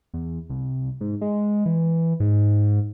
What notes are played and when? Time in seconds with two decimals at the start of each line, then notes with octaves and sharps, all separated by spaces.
0.14 E2
0.50 C2
1.01 G#2
1.21 G#3
1.66 E3
2.20 G#2